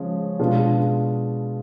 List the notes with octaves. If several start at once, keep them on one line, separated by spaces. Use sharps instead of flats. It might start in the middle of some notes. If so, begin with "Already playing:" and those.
Already playing: C#3 F3 G#3 C#4
B2 G#3 B3 D4 F4